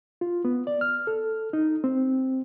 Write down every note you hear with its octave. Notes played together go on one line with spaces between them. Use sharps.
F4
B3
D5
F6
A4
D#4
C4